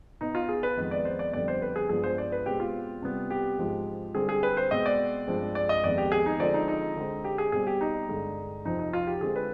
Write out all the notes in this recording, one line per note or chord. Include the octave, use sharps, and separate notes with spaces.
B2 B3 D#4
F4
G#4
B4
F2 D#3 G#3 B3
D5
C5
D5
F2 D3 G3 B3 D5
C5
B4
G#4
G2 F3 G#3 B3 G#4
C5
D5
B4
B2 G#3 C4 G4
F4
C3 G3 B3
G4
G#2 F3 G#3
D3 G3 C4 G#4
G#4
B4
C5
B2 G#3 C4 D#5
D5
G2 F3 G#3 C4
D5
D#5
F2 D#3 G#3 B3 D5
G4
G#4
D#4
D3 F3 G#3 C4 D5
D#4
D#4
D3 G#3 C4
G4
G#4
B2 G3 C4 G#4
G4
D#4
G2 D3 G#3
F2 C3 F3 C4 D#4
D#4
F4
G4
D3 G#3 C4 G#4
B4